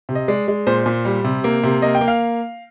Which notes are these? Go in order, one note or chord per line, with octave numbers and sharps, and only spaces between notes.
C3
D#5
G#3 D5
G#3
A#2 C5
A#2
G3
C3
A#3
C3
A#3 D#5
G5
A#3
F5